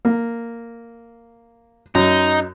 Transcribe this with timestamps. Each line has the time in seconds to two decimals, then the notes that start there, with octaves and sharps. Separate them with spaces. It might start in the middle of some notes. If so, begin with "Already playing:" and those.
0.05 A#3
1.95 F#2 D#4